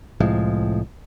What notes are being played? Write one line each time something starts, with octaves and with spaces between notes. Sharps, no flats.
C2 A2 F3 G#3